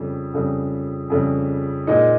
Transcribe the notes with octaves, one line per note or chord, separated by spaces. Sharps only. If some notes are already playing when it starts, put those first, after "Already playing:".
Already playing: F2 C#3 G3
F2 C#3 G3
F2 C#3 G3
A#2 G#3 D#4